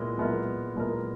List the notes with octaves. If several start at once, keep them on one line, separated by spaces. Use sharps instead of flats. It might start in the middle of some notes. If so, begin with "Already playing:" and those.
Already playing: A#2 G#3 B3 E4 A#4
A#2 G#3 B3 E4 A#4
A#2 G#3 B3 E4 A#4